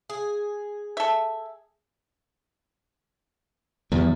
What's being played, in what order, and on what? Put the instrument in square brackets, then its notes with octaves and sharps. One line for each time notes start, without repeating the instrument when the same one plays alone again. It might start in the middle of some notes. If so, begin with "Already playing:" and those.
[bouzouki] G#4
[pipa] A4 E5
[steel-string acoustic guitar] E2 [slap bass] D#3 F3 G3